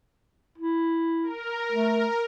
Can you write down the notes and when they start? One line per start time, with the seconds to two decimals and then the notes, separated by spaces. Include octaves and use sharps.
0.58 E4
1.23 A#4
1.72 A3